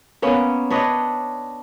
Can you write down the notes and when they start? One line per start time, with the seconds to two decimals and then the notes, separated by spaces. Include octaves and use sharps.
0.22 A#3 B3 C#4
0.70 D4 B4 C#5 D#5